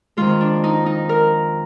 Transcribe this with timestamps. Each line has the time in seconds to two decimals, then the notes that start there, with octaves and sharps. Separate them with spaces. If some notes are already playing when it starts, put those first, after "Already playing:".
0.17 F2 D#3 G#3 F4
0.41 D4
0.64 D#4
0.86 D#4
1.09 A#4